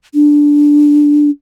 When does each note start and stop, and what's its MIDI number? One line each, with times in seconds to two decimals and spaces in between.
0.14 1.30 62